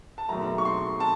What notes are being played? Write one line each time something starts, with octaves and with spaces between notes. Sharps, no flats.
A5
E1 D#2 D#3 F#3 A3 A#5
A#5
C#6
C6
A5